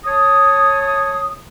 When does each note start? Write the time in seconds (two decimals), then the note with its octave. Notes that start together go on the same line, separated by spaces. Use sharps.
0.05 C#5 A5 D#6